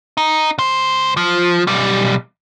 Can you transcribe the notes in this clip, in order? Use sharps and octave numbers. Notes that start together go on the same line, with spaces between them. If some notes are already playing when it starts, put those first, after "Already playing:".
D#4
C#2 C5
F3
B1 G3